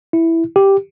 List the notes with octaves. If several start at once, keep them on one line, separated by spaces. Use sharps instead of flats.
E4
G4